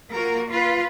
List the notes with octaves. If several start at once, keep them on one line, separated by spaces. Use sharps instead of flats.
A#3 F4 F#4 A#4
F4 B4